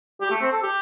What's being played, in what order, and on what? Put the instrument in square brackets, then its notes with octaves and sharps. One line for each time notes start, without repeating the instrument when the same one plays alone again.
[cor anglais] G4
A3
C4
A4
G4